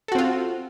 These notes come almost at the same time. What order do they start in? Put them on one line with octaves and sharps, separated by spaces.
A4 F#4 C4 F4